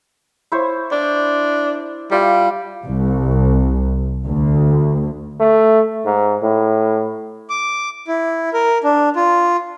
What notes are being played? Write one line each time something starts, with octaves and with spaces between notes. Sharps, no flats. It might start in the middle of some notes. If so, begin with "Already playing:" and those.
E4 C5 C#5
D4 D6
G3 F4 D5 E5
C2
D2
A3
G#2
A2
D6
E4
A#4
D4
F4